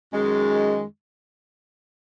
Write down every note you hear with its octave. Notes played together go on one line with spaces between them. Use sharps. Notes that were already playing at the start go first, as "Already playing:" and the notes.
F#2 D#3 G#3